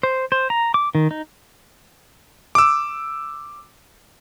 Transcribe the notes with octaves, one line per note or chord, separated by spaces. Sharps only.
C5
C5
A#5
D6
D#3
D#4
D6 E6